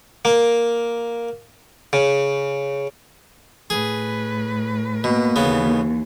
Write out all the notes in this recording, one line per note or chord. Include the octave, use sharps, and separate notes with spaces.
A#3
C#3
A2 G#4 B4
B2 A#3
D#2 C#3 E3 B3